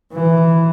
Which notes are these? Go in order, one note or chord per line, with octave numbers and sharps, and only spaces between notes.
E3